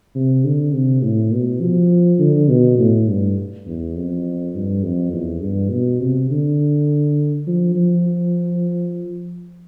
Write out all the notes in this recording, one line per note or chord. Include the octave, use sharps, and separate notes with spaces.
C3
D3
C3
A2
B2
F3
D3
B2
A2
G2
E2
F2
G2
F2
E2
G2
B2
C3
D3
F3
F3